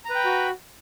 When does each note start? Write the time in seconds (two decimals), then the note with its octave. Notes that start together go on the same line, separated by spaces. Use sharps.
0.05 A#5
0.10 B4
0.15 G5
0.20 B5
0.25 F#4